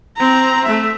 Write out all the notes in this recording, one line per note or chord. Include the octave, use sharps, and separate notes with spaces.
C4 A#5
A3 E5